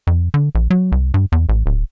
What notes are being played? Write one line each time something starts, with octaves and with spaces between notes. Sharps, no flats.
F2
D3
A#1
F#3
C2
G2
E2
A1
D1